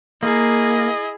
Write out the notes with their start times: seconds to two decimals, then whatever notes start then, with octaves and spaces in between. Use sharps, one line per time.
0.23 A#3 E4 G#4 D#5